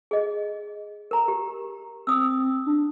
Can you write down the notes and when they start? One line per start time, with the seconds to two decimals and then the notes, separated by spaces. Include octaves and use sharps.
0.11 G#4 D#5
1.11 A#4 A#5
1.28 G4
2.07 C4 D#6 E6
2.66 D4